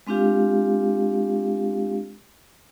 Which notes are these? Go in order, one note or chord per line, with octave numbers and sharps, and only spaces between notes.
G#3 C4 D4 F4 G4 F5